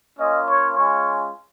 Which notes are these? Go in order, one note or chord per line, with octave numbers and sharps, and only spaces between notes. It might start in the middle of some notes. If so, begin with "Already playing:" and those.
A#3 C#4 F4 D#5
C#5
G#3 C#4 F4 C#5